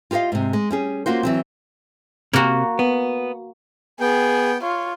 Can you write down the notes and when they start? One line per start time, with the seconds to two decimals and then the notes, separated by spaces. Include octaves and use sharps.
0.11 F4 G4 A4 D#5 F5
0.32 G#2 C3
0.53 G#3
0.71 G3 C#4 G#4
1.06 A#3 C#4 F4 F#4 C5
1.23 E3 F#3 C4
2.33 C3 A#3 F#4 A#5
2.79 B3
4.00 B3 G#4 G5
4.62 F4 C#5